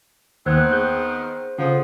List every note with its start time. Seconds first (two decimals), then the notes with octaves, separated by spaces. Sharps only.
0.46 D#2 D#3 B3 C4 C5 E6 F#6 G#6
0.73 G#4 G6
1.59 F2 C#3 F3 F#5 D#6